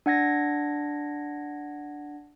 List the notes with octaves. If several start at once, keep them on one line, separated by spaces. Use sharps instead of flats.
D4 F#5 G#6 A#6